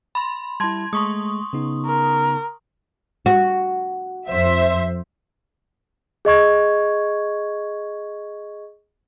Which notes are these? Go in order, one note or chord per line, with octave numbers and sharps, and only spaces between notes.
B5 C6
G3 E4 A5 C6 G#6
G#3 A3 C6 C#6 D#6
C#3 B3 D#4
A#4
F#4
F2 C5 E5
G#4 D#5 C#6 G#6